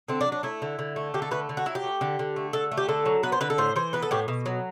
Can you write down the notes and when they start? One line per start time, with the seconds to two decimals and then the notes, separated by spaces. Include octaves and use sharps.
0.08 D3 C4
0.21 D4
0.26 F#3
0.32 D4
0.43 A3 E4
0.62 D3
0.79 D3
0.96 A3
1.14 D3 G4
1.22 A4
1.31 A3 B4
1.49 D3
1.57 F#4
1.66 F#3 E4
1.75 G4
1.84 A3
2.01 D3
2.19 D3
2.36 A3
2.53 D3 A4
2.71 A3
2.77 G4
2.89 D3 A4
3.06 F#3
3.23 B3 B4
3.32 C5
3.41 D3 B4
3.50 A4
3.58 A2 C5
3.76 E3 C5
3.93 B3 B4
4.02 A4
4.11 A2 G4
4.28 B2
4.46 F#3